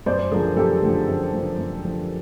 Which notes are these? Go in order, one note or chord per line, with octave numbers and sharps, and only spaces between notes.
F#2 C5 D5
D3 F3 G#4 A#4
F#2 G4 A4
D3 F3
F#2
D3 F3
F#2
D3 F3